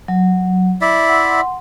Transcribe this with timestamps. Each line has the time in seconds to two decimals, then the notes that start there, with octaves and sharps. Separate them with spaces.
0.08 F#3
0.81 E4 D5 E5
1.09 F#5 C6